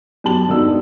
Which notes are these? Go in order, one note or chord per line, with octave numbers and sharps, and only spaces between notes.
F#2 B2 G4 A5 F#7
E1 G2 B2 D3 D#4 E6